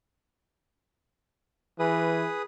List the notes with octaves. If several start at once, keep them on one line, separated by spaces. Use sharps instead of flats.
E3 G#4 B4 D#6